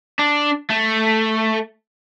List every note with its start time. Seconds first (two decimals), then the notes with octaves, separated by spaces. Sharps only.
0.19 D4
0.70 A3